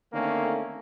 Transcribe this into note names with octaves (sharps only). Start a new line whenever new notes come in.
D3 D#3 A3 A#3 C4 C#4